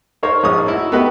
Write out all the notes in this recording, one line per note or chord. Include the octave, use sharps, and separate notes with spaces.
D#4 A#4 C5 C#5
A#1 D#4 C#5 D#6
D#4 E4 F#4
B3 F#4 G4 B4 D#5